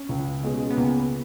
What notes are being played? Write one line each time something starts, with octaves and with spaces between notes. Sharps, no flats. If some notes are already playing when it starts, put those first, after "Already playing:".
Already playing: C#4
C#2
B2 G#3
B3
C#2 A#3